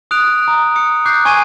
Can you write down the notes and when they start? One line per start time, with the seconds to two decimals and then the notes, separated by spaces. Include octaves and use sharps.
0.11 D#6 F#6 D7 F7
0.48 A#5
0.76 D#6 C#7
1.05 D6 F#6 G6 C7
1.25 G#5 C#6 G#6 D7 D#7